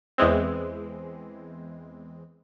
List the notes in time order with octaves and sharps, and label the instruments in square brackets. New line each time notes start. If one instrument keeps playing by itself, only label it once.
[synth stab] E2 E3 G#3 C4